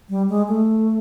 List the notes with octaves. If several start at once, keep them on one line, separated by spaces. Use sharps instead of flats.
G3
G#3
A3